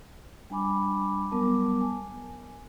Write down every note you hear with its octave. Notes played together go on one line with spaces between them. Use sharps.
G3 D4 G#5 B5 D6
F#3 G3 B3 A#4 A5 D6
G#5